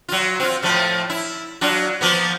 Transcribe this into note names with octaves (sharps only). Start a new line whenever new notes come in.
F#3 F4
C4 F4
A2 F3 A3
E4
F#3 D4 F4
F3 A#3 B3